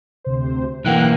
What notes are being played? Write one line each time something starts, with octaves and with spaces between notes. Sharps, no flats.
D2 C3 C5
B1 E3 A#3 F#5 G5 F#6